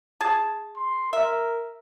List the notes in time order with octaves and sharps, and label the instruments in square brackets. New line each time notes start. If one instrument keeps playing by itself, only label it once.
[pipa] G#4 A5
[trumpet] C6
[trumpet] A#4 [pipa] E5